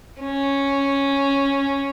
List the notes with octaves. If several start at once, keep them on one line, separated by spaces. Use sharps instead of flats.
C#4